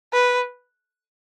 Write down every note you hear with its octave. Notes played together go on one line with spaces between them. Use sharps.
B4